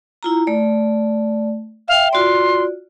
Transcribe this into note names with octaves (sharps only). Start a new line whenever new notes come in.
E4 F4 A#5
A3 D5
E5 F5 G5
F4 F#4 D5 C6